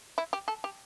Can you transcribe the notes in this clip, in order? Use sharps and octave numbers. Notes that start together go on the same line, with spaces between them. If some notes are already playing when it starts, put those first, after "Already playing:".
E4
G4
A4
G4